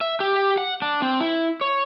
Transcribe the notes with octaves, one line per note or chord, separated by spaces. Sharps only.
E5
G4
F#5
D4
C4
E4
C#5